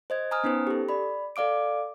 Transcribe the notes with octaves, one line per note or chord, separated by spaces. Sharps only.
C5 D#5 G#6
G#5 A#5 D#6 F6
B3 C#4 D#4 B4 C5
G4 A4
D5 B5
A4 D5 F5 D6 D7